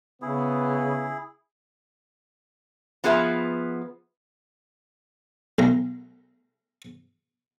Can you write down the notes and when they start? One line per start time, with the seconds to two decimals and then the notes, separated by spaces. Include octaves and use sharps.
0.22 C#3 B3 E4 G#4
3.04 F3 B3 F4 G#4 B4 E5
5.59 B1 A#5